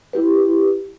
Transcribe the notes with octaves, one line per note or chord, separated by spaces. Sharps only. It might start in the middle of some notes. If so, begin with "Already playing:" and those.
E4 G4 B4